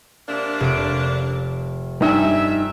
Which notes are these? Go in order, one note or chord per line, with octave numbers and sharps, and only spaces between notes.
C3 A#3 D4
F1 D7
G2 D#4 E5 G#5